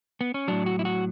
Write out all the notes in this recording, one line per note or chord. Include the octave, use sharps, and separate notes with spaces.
B3
C#4
A2 F#3 D4
F#4
E4
F#4